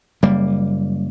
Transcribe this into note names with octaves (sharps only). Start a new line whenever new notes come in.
F#1 G3 A#3